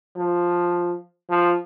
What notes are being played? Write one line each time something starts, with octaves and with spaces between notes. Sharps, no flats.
F3
F3